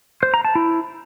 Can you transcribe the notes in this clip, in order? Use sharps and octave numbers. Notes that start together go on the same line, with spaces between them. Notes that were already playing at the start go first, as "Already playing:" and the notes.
C5
A#5
A5
E4